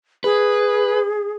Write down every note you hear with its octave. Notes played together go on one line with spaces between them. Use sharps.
G#4 B4